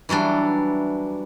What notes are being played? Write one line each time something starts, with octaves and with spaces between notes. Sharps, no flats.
E3 F#3 G3 D4